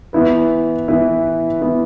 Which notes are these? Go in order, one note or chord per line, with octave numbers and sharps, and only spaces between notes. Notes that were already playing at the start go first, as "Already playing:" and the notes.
E3 B3 E4 B4
E3 B3 E4 B4
E3 B3 E4 B4